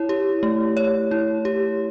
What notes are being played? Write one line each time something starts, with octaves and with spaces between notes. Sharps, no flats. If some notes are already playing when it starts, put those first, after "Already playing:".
Already playing: E4 C#5
G4
A3
C#5
E4
G4